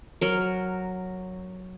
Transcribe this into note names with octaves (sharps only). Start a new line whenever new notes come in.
F#3 A#4